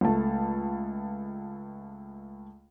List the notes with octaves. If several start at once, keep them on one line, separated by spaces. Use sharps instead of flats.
C#2 A3 A5